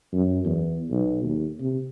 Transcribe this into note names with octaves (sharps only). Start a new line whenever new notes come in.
F#2
E2
B1
D#2
C3